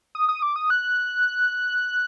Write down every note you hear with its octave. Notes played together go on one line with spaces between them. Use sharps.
D#6
D#6
D6
D#6
F#6